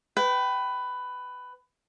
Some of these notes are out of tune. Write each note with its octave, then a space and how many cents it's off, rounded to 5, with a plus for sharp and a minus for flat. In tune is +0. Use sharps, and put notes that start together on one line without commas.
B4 +15 G5 -25